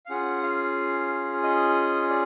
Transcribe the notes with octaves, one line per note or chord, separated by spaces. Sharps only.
F5
C#4 F4 G#4 F#5
F5
D#5
D5